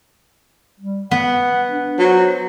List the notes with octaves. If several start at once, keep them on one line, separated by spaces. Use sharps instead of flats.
G3
B3 F#5
D4
F#3 C5